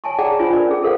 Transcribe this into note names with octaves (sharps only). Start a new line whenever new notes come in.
C#5 G#5 A5 C#6
G#4 D5 F#5 G5 A5 A#5
D4 F4 C5 G#5 B5
A#4 B4 D5
C#4 G#4
A4 A#4 C5 F5 F#5